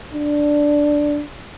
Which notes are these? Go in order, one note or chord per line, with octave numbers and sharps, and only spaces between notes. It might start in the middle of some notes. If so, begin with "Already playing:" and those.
D4